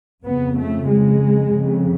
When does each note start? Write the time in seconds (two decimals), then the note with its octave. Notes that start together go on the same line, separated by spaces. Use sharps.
0.24 F2 C#3 B3
0.57 A3
0.88 G#3
1.52 F2 C#3